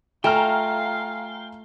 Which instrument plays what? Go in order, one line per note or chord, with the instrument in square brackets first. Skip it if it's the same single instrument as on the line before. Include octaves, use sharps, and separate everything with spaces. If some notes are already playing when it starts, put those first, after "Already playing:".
[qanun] A3 [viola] F4 F5 [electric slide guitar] G5 [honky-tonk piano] G#5 A#5 F6